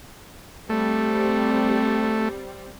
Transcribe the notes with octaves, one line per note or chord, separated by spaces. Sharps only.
G3 A3 C4